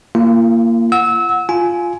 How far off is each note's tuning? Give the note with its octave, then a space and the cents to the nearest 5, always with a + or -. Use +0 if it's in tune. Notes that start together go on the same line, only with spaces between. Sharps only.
A#3 -10 F4 -40
F#5 -20 E6 -25
F4 +0 G#5 +15